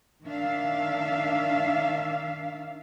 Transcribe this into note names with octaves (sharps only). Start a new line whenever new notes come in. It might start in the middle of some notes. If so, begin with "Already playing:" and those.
D#3 D4 E5 F5